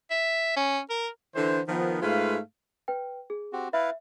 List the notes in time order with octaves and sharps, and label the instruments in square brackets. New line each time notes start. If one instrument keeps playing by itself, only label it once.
[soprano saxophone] E5
C#4
A#4
[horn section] D3 E3 C5
D#3 F3 B3
G#2 G#3 A3 F4 B4 F5
[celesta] B4 G5
G#4
[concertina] C4 F#4 G4
[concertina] E4 B4 F5 [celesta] E5